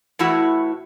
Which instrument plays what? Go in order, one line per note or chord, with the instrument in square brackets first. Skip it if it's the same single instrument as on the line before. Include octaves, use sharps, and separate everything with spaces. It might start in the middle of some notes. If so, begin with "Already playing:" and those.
[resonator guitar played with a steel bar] A2 E3 E4 F#4